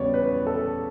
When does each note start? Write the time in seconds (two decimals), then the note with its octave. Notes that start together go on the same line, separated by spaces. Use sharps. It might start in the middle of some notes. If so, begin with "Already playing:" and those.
Already playing: E2 C#3 G3 B3 C#5 D5
0.14 B4
0.47 A4